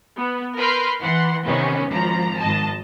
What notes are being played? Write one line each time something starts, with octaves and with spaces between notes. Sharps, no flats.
B3
A#4 B4 B5 C6 F6 G6
E3 F#5 C6
C3 D#3 B3 C#4
G#1 F3 A#5
G#1 D#5 A5